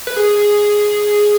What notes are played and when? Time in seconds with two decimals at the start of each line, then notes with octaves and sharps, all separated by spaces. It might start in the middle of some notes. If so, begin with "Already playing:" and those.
0.07 B4
0.16 G#4